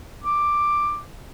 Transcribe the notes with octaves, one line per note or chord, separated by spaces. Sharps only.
D6